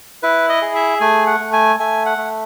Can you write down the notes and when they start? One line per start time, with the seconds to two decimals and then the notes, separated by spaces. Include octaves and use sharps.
0.23 E4 B4
0.49 D#5
0.62 G#4
0.75 E5
1.01 A3 G#5
1.27 F#5
1.40 A3
1.53 G#5
1.79 A3 G#5
2.06 F#5
2.18 A3